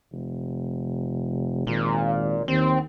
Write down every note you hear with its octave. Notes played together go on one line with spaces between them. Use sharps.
F1
G#1 A#2
D#2 C4